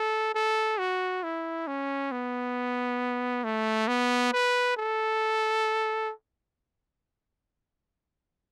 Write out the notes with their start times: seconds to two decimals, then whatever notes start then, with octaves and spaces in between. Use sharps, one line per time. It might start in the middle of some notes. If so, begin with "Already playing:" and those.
Already playing: A4
0.35 A4
0.79 F#4
1.23 E4
1.68 C#4
2.12 B3
3.44 A3
3.88 B3
4.33 B4
4.77 A4